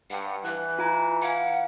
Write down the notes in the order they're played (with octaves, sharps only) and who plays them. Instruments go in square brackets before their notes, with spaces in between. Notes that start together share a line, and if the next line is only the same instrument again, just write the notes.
[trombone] G2 [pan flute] F#5
[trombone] E3 [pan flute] F#6
[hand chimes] F4 G#5 A#5
[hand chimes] F5 G#5 C#7 [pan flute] F#5